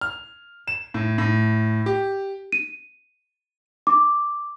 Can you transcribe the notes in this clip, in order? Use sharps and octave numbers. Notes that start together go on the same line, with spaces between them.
F6
E7
A2
A2
G4
D#7
D6